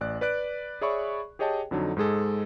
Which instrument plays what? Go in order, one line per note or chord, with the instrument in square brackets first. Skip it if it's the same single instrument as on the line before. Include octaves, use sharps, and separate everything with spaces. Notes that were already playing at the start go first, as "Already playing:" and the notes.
[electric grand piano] A1 D5 F#6
B4 D5 F#6 D7
G#4 C#5 D5 E5 B5 C#6
G4 G#4 C#5 D#5 G5 A5
F2 D3 F#3 D#4
G#2 G#3 G#4 A4